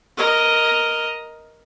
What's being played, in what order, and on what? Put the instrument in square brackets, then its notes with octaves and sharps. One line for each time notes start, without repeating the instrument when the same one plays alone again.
[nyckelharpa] A#4 D#5